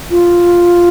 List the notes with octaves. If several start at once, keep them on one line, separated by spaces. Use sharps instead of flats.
F4